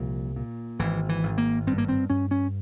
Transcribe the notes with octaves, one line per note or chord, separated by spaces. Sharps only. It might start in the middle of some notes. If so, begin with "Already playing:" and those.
Already playing: C2 A#2 F3
A#2
G#1 E3
E3
G#1
A#3
G2 C4
A#3
C4
G2 C#4
C#4